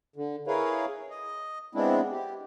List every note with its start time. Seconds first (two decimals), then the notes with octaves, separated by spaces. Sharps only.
0.16 D3
0.47 E4 G#4 A#4 B4 C#5 F5
1.10 D#5
1.75 G#3 B3 C4 D4 E4
2.12 G4